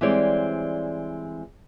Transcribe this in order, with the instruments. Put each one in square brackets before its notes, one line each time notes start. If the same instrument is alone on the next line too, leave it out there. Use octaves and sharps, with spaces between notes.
[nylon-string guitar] E3 G3 G#3 C4 C#5 D5